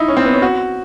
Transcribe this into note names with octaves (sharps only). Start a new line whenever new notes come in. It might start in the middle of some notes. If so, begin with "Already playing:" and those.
Already playing: D#4 E4
C#4
C4
B3
C#4
F#4